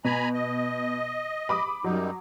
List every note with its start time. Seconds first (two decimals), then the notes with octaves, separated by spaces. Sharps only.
0.04 B2 G#5 A#5 B5
0.34 D#5
1.49 B5 D6 D#6
1.84 F#2 F#3 G3 D#4